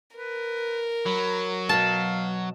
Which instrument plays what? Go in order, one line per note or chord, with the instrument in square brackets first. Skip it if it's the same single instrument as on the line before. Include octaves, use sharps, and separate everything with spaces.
[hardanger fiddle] A#4 [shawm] B4
[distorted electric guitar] F#3 [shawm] B5
[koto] B2 A5 [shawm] F5